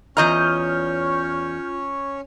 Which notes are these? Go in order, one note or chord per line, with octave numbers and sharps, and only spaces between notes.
E2 C#4 F4 C#5 D#5 A#5 F6 G6